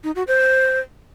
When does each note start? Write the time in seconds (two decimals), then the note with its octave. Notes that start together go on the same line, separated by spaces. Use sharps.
0.04 D#4
0.16 F#4
0.27 C5